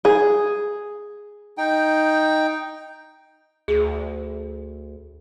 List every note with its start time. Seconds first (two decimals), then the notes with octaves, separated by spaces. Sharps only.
0.05 G#4
1.58 D#4 G5
3.68 D2 G#4